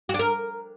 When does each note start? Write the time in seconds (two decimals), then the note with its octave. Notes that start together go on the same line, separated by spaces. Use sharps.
0.09 F#4
0.14 D4
0.19 A#4